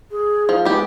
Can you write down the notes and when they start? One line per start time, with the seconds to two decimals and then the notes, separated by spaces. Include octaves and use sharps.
0.11 G#4
0.49 F3
0.65 G#3 B3 G4